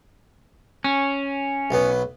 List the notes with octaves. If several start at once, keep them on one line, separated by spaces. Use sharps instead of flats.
C#4
B1 F#3 B3